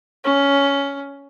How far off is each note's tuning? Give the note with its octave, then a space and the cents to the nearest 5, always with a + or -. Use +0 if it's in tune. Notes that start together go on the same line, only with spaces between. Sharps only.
C#4 +10